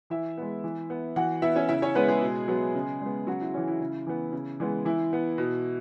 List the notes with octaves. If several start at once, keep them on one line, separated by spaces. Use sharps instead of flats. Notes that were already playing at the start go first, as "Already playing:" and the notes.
E3 E4 E5
G#3 B3
E3
B3
E3 F#4 F#5
B3 E4 E5
C#4 C#5
C#3 E4 E5
C#4 C#5
G#3 B3 C#4 B4
G#3 G#4
B2
F#3 B3
C#3
G#3 B3
C#3 F#3 F#4
E4
E3 C#4
E4
C#3
E3 B3
C#3
E3 G#3 B3
E3 E4
B3
B2